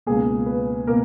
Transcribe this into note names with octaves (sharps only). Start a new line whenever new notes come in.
C#2 B2 A#3 G#4
B4
B2 A#3 A#4